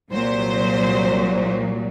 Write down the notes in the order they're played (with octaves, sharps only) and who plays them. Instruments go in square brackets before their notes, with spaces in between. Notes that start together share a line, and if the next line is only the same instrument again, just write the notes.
[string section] C2 A#2 F#3 C5